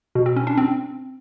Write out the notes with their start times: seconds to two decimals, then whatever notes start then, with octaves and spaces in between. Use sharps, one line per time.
0.15 B2
0.26 C4
0.36 C#4
0.47 D4
0.57 C4